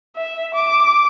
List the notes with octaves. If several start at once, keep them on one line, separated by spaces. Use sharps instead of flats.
E5
D6